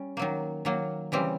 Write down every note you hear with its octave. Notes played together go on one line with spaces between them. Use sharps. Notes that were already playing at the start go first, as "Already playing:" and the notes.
Already playing: G3 C#4
D#3 F#3 A#3
D#3 F#3 A#3
C#3 E3 G3 C4